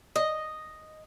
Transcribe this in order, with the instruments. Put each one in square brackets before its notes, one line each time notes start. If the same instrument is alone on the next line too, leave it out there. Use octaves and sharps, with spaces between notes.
[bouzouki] D#5